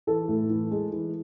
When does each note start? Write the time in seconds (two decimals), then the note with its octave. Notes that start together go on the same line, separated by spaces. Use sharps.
0.07 E3 A4
0.28 A2
0.50 E3
0.71 G#3
0.92 E3